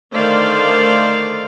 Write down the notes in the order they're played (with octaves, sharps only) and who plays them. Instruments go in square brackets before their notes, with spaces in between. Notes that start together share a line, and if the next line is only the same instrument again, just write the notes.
[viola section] D3 D#3 A3 C5 D5 F5